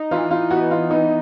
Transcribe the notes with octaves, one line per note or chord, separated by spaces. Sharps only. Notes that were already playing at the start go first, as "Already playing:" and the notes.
Already playing: D#4
E3 F4
F4
B3 F#4
F4
E3 D#4